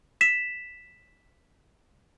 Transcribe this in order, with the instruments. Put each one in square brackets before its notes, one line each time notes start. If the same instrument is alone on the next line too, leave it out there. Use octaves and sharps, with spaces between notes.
[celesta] B6 E7